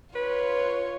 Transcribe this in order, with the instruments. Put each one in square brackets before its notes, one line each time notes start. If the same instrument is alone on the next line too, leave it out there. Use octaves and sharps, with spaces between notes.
[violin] F4 C#5 [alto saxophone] B4